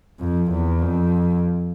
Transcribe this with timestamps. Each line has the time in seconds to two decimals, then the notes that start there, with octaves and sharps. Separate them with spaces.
0.20 F2
0.51 E2
0.82 F2